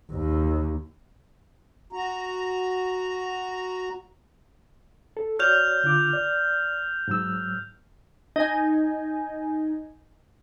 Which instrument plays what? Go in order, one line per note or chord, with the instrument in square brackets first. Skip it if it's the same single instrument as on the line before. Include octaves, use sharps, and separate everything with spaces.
[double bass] D#2
[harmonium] F#4 A#5
[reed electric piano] A4
[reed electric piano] F#4 C#5 D5 [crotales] F6 G6 F7
[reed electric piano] D3 F4 D6
D5
G#2 F#3 E6
[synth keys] D#4 G#5